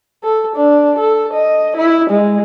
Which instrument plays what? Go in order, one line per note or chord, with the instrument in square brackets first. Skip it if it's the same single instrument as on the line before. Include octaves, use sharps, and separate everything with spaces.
[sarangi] A4
D4
A4
D#5
E4
G#3